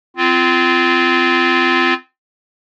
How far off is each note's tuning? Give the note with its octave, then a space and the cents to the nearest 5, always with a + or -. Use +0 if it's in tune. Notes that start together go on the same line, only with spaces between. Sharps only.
C4 -25 F4 -20